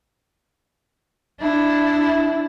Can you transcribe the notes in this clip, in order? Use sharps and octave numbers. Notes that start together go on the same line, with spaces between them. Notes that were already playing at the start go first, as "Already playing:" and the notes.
D4 E4